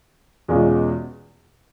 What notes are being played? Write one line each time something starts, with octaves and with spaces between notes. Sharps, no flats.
E2 B2 G#3 C#4 F4